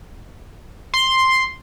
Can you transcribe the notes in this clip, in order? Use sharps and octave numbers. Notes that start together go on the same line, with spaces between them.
C6